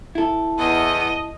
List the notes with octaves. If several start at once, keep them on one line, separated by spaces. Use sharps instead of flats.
E4 A4
E2 D#5